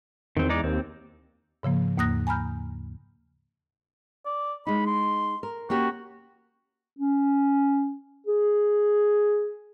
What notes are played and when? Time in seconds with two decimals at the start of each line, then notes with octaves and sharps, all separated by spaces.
0.37 E2 D#3 C4
0.49 G#3 D#4 D5
0.64 D#2 C4
1.63 G#2 C#3 F3 A#3
1.97 D#2 G#2 A#3 D#6 F#6 A#6
2.27 G#5 A#5 B5 F6 G6
4.26 D5
4.67 G#3 D#4 B5
4.86 C6
5.43 A#4
5.70 A#3 C#4 F#4 G4
6.99 C#4
8.27 G#4